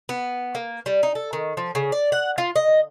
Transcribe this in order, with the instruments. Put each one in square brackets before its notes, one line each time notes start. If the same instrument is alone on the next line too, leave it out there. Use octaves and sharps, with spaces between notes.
[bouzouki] B3
A#3
G3
D#4
A4
D#3
F3
C#3
D5
F#5
F4
D#5